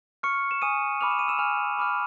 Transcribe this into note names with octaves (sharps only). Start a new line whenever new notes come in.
C#6 F6 C#7
E7
G#5 D#6 D#7
B5 D6 F6 F7
E7
D#7
E6 E7
G#5 F6 F7
B5 D6 F6